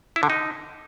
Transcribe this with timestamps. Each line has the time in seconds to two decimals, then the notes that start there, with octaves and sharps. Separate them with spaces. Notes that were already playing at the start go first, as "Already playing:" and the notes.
0.16 E4
0.23 D3
0.30 D#4